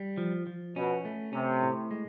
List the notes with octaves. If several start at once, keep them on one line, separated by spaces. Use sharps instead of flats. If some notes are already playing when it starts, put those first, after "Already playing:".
Already playing: G3
F3
F3
B2 C#4
A3
C3 C#4
A2
G#3